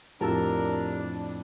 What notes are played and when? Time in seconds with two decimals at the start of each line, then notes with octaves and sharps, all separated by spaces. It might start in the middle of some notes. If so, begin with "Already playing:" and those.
0.21 F2 A2 D4 G4 A#4 A5 E6